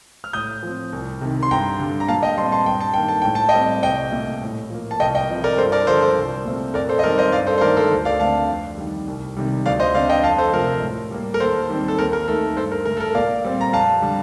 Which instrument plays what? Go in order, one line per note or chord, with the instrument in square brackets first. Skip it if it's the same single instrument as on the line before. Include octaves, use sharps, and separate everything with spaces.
[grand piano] F6
A2 D#6 G6
F3 C4
C2
C3 D#3
C6
G2 G5 A#5
D3 G3
A#5
A#2 F5 A5
D#5 G5
G3 A5 C6
C4
A5 C6
G2 G5
A5
D#3 A#3 G5
A5
A2 G5
A5
D#5 G5
G3 C4
C2 D#5 G5
A#2 A3
A2
F3 A#3
A5
C2 D#5 G5
D#5 G5
C3 F3
A#4 D5
G2 A4 C5
A#4 D5
D3 F3 A4 C5
A4 C5
C2
A#2 A3 C4
F2 A#4 D5
A4 C5
D#5
D#3 G3 C4 A#4 D5
C5 D#5
G2 D5 F5
A4 C5
C5
D#3 A3 A#4 D5
A4 C5
D2
D5 F5
D3 A3 C4 F5 A5
F2
D#3 G3
C2
C3 D#3 G3
D2 D5 F5
C5 D#5
D3 A3 C4 D5 F5
D#5 G5
F2 F5 A5
A4 C5
C3 F3 A3 A#4
A2
G3 A#3
A#4
D#2 A4 C5
D#3 G3 C4
A4
D#2 A#4
A#4
D#3 A3 A4
G2 A4 C5
A#4
D3 A3 A#4
A4
A#4
A#2 D5 F5
G3 C4
A#5
F2 F5 A5
D3 G3